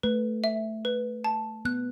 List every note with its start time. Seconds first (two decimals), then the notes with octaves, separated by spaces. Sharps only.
0.03 A3 B4
0.44 E5
0.85 B4
1.24 A5
1.65 B3 F#6